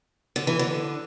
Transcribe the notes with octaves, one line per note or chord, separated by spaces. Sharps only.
D3
E3
D3